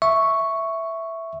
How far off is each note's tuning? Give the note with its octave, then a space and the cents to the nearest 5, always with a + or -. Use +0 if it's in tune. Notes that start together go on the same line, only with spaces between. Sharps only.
E5 +0 C#6 +0